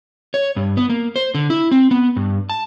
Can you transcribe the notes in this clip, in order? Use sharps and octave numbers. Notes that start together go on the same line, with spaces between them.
C#5
G2
B3
A#3
C5
D3
E4
C4
B3
G2
A5